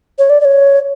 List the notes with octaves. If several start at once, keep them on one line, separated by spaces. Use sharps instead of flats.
C#5
D5
D5
C#5